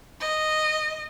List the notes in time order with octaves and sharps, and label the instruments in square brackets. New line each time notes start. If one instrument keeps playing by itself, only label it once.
[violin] D#5